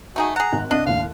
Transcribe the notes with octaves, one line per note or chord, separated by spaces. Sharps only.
A3 D#4 F#4 G#4
G#4 F#5 A#5
G#1 D#4 F#6
C2 D4 D#5
D#2 A2 F5